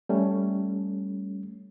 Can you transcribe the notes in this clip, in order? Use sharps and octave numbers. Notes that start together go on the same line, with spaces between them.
G3 A3 C#4